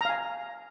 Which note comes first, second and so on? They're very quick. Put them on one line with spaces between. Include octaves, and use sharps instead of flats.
A#5 F5 G#5